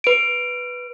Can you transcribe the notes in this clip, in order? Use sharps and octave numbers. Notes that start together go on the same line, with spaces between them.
B4 D7